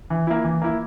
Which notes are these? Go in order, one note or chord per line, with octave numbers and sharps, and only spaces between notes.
E3
A#3 E4
E3
A#3 E4